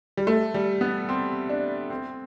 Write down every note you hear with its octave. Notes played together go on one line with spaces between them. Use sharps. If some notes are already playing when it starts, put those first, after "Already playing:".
G3
A3
G3
B3
C4
D4
C4